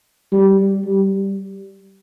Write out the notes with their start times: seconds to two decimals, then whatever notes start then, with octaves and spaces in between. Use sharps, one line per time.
0.32 G3
0.85 G3